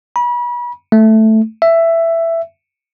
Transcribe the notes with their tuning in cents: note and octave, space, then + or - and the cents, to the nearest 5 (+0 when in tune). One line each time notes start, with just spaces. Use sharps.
B5 -35
A3 +0
E5 +10